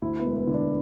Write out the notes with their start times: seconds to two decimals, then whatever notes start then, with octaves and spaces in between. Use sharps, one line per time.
0.02 D2 E4
0.19 B3
0.25 E1
0.36 B3
0.47 D3
0.54 D4